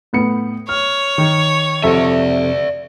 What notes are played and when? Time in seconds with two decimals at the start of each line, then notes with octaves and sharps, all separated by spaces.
0.13 A2 B3 C#7
0.69 C#5 F6
1.18 D#3
1.83 F2 C3 A4 D5 E5